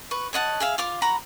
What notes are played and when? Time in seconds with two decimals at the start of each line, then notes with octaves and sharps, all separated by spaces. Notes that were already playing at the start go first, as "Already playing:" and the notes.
0.11 B4 C#6
0.33 C#5 D#5 F#5 A5
0.60 G#4 E5 F5
0.78 F4 F5 D6
1.02 F#4 A#5 B5